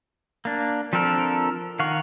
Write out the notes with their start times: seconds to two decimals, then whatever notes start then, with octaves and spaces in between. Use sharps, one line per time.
0.45 A#3 D4
0.93 F3 C4 D4 A4 A#4
1.79 D#3 F5 F#5 C#6